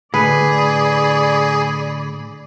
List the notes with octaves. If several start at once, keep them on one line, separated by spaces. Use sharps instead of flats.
A2 D3 G#4 B4 D5 B5